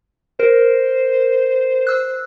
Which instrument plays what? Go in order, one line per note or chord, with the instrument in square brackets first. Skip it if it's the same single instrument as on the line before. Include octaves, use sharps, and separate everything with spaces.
[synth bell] A#4 [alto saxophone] C5
[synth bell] E6 F#6